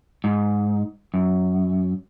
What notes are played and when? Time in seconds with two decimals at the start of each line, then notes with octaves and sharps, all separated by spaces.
0.24 G#2
1.14 F#2